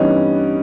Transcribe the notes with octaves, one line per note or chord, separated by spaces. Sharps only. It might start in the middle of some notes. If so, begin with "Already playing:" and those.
Already playing: G2 E3 G3 B3 C#4 D#4